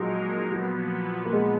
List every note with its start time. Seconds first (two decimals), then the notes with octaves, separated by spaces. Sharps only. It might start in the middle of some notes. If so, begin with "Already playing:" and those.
Already playing: A#2 F3 F#3 G#3 D#4 A#4
0.50 A#2 F3 F#3 B3
1.25 A#3
1.33 G#3